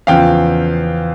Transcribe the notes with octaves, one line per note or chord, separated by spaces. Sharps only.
E2 C#3 F3 F5 G5